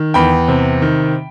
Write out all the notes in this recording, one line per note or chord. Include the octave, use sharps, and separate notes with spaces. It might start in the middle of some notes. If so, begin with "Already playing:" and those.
Already playing: D#3
E2 G5 B5
C3
D#3